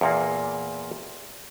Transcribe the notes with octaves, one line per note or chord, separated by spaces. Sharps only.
E2 A#2 A#3